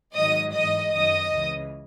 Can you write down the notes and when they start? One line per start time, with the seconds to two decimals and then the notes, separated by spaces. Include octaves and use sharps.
0.15 G#2 D#3 F#3 D#5 D#6
0.53 G#2 E3 D#5 D#6
0.91 F#2 D#3 F#3 D#5 D#6
1.30 C#2 C#3 E3